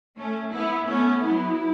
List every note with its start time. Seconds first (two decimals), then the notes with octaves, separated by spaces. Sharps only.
0.18 A3 C#4
0.53 B3 E4
0.89 A3 B3 C#4
1.24 F#3 B3 E4